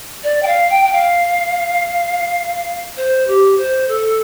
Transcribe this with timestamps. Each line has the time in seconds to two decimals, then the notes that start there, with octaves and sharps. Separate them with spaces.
0.23 D5
0.42 G5
0.47 F5
0.70 G5
0.84 G5
0.92 F5
2.97 C5
3.27 G4
3.57 C5
3.88 A4